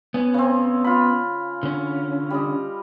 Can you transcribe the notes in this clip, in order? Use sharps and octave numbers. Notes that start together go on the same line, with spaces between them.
B3 C#4 G#5
C#3 C4
F4 B5
D3 C#4
G3 D#5